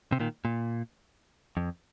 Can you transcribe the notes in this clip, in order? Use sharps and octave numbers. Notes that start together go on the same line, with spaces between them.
C3
A#2 D#3
A#2
F2